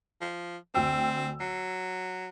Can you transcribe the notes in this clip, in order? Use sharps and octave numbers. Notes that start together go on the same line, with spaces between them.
F3
D2 C4 G5 E6
F#3 C7